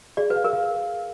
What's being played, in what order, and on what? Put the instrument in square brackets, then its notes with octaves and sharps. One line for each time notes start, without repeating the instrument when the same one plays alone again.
[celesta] G#4 [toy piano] D5
[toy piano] B4
[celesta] F5
[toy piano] A#4
[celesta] F5